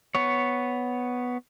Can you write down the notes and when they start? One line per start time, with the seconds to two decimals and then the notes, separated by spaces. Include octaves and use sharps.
0.15 B3 C#5